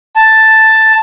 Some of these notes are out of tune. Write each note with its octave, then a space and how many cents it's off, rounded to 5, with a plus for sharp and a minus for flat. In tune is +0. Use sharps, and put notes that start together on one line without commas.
A5 +5